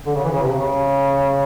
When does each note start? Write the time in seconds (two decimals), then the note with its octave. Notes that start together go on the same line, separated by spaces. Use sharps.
0.07 D3
0.15 C#3
0.23 E3
0.32 C#3
0.42 C3
0.52 C#3